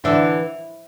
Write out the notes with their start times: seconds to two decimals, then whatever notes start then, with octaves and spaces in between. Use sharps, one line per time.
0.04 D3 E3 D4